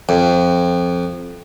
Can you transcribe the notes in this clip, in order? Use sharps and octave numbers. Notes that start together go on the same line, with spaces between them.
F2